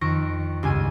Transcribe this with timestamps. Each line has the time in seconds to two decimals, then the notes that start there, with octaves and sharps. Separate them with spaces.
0.01 F2 D#3 C#6 A#6 D7
0.63 C#2 G2 G#5 D#7